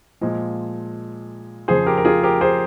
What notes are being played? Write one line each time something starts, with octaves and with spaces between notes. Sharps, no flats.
A#2 F3 G#3
F2 C#3 F3 G#4 C5
G4 A#4
A#4
F4 G#4
G4 A#4
G#4 C5